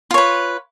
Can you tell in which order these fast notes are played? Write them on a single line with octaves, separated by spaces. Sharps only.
F4 C#5 B4